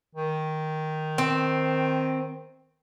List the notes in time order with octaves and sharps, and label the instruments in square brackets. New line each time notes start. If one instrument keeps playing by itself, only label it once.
[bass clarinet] D#3
[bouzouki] C4